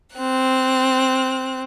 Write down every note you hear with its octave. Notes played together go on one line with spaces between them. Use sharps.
C4 F#6